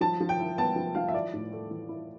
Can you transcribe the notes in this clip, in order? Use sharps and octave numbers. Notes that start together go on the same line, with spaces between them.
F3 A5
F3
G5
E4
B3 A5
F3
F3 F5
E5
E4 D5
A2
A3
E3
E4